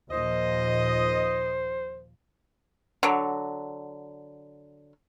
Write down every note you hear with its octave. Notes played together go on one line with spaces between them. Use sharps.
D#2 A#2 F3 C5 D#5
D3 F#3